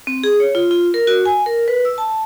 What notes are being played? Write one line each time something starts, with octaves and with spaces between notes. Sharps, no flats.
C4
G#4
C#5
F4
F4
A#4
F#4
G#5
A#4
B4
E6
A5